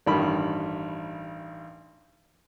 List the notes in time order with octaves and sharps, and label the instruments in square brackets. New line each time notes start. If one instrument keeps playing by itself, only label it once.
[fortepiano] A1 G2 D#3 B5